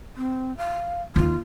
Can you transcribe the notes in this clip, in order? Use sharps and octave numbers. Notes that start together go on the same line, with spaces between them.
C4
F5
D#2 D#4 F4